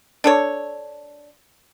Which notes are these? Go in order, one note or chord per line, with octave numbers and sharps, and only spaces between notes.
D4 A4 C#5